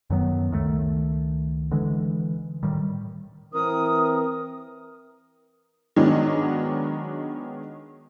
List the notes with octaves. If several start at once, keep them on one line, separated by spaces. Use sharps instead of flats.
F#2 D#3 F#3 B3
C#2 D#3 E3 A3
D3 E3 G#3
A2 D#3 G3
E3 C4 A#4 D#6
D#3 F#3 G#3 B3 D4 D#4